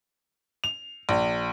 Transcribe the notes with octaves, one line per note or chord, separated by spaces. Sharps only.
F7
A#1